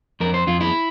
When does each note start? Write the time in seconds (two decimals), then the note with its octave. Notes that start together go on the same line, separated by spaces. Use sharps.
0.20 F2 A#4
0.34 C5
0.47 F2 F4
0.61 E4